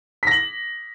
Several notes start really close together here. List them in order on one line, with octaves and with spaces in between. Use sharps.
B6 A#6 F#7